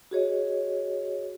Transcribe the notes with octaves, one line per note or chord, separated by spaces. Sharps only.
F#4 G#4 C#5 D#5